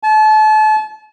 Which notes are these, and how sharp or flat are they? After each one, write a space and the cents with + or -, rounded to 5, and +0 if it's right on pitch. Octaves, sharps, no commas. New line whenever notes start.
A5 -35